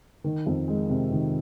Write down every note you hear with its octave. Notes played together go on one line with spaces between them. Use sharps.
D#3
F2
G#3
C3
D#3